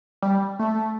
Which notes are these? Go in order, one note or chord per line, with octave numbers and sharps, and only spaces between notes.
G3
A3